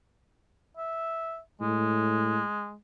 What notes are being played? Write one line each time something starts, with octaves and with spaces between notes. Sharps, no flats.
E5
A2 G#3